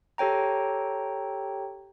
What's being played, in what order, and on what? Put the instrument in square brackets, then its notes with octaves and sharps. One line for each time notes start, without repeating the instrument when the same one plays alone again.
[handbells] G4 A4 C#5 G5 A#5